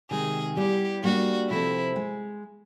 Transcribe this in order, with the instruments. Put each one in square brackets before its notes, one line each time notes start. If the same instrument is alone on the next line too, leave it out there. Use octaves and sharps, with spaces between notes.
[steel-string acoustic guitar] C3 D#3 G#3 [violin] G#4
[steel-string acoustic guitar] G3 B3 E4 [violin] G4
[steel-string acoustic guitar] G3 A#3 D4 [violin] F#4
[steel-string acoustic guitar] C3 F3 A3 C4 [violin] E4
[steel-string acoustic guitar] G#3